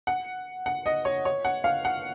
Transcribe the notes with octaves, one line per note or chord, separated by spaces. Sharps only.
F#5
F#5
D#5
C#5
C#5
F#5
F5
F#5